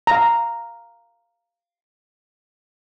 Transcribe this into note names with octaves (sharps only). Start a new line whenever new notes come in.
F5 A#5